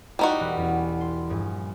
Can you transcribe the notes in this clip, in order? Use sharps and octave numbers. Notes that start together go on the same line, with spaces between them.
G3 D#4 E4 F#4 C#5
E1 B4 F#5
E2 C#4
C6
A#1 G2 G#4